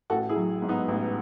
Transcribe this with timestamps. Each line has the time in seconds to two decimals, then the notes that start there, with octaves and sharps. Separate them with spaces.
0.10 A1 F#4 A4
0.29 E4 G#4
0.36 F#3
0.62 G#2
0.69 B3 D#4
0.88 A1